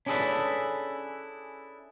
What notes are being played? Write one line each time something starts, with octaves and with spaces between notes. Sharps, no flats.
C#4 D4 E4 G#4 A4 B4